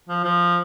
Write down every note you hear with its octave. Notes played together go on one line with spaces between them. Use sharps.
F3
F3